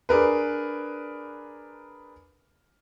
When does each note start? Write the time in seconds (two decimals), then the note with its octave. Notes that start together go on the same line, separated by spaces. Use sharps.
0.09 D4 G#4 A#4 B4